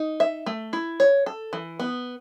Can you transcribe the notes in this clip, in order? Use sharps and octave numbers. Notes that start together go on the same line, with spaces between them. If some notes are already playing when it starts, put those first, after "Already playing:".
Already playing: D#4
E5
A3
E4
C#5
A4
E3
B3